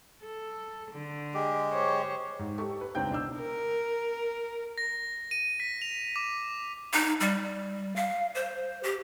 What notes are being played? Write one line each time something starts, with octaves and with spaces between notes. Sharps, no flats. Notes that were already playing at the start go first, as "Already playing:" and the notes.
A4
D3
G#3 G4
C5 C#5
G#2
G4 A4 C#6
B4
C#2 C4 D4 G5 G6
B2 D4 E6
A#4
A#6
D#7
B6
F7
D6
D#4
G3
F5
C5
G4